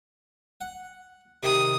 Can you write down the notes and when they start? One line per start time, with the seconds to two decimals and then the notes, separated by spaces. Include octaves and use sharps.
0.61 F#5
1.43 C3 D#3 D#6